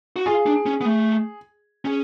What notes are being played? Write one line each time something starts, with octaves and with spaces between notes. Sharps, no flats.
F#4
F4 G#4
D4
C#4
B3
A3
C#4 G#4